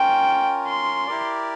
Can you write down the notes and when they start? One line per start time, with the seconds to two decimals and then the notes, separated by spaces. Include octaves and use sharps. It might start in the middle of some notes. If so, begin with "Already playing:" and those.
Already playing: C#4 F4 A#4 G5
0.69 C6
1.07 E4 G4 A#4 D5